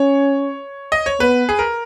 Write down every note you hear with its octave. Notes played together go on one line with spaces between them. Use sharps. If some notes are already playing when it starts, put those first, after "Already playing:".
Already playing: C#4 C#5
D#5
C#5
B3 B4
G#4
A#4